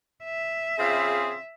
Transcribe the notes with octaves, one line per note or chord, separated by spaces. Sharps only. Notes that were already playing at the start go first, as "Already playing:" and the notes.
E5
C#3 C4 F4 G#4